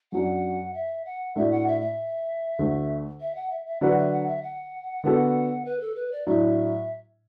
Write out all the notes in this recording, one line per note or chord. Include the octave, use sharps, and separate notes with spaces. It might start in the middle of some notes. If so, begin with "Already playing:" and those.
F#2 F#3 D4 F#5
E5
F#5
A2 A3 D4 F#4 D5 E5
F#5
E5
E5
D2 D3 A3
E5
F#5
E5
E5
D3 F#3 D4 F#4 B4 F#5
E5
F#5
E5
F#5
D3 B3 F#4 A4
B4
A4
B4
D5
A2 F#3 D4 E5